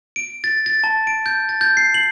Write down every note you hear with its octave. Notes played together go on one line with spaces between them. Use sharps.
D7
A6
A6
A5
D7
G6
A6
G6
C7
F#7